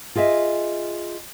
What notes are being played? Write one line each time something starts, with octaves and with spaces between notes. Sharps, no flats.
F4 G#4 D#5 E5